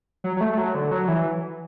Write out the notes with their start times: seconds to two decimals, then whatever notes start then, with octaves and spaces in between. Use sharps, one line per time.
0.24 F#3
0.37 F#3
0.41 A3
0.52 A3
0.58 F#3
0.75 D3
0.91 F#3
1.08 E3